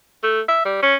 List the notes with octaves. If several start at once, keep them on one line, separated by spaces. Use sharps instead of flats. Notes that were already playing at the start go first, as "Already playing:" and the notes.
A3
E5
G3
C#4